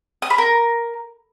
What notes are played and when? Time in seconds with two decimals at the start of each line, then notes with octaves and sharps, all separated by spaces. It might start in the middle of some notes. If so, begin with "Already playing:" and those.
0.22 D#6
0.30 B5
0.38 A#4